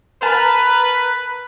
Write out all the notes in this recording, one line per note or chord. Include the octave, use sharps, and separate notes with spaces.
A#4 B4 A5